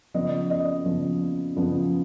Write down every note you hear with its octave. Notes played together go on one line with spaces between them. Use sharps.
C#3 F3 B3 D#5
D#5
C#3 F3 B3
C#3 F3 B3